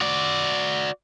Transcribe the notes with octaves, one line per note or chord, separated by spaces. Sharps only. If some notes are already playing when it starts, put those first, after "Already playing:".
F#4 D5